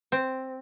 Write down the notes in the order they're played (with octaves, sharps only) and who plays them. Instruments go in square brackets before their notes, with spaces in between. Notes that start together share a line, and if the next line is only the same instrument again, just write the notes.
[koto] C4